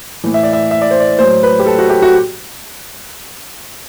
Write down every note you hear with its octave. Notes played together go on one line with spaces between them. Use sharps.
A2 E3
E5
D5
E5
E5
D5
C5
D5
A2 F#3 C5
B4
G4
A4
F#4
G4
F#4